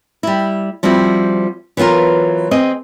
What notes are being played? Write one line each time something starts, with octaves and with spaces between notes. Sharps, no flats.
G3 E4
F3 G3 C4 E4 F#4
E3 F#3 B3 F4 A#4
C4 G#4 D#5